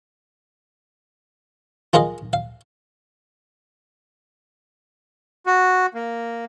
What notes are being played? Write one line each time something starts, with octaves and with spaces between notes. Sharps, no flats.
F4 G#4 A#4 D#5 F5
F5
F#4
A#3